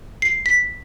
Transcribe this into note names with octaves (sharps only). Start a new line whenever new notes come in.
C7
B6